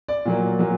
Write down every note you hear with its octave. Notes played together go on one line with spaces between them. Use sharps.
D5
A#2 F#3 A#3
A#2 F#3 A#3